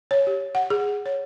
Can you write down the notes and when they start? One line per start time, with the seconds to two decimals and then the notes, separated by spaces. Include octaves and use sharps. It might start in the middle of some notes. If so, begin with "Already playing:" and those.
0.11 C#5
0.27 G4
0.55 F#5
0.70 G#4
1.06 C#5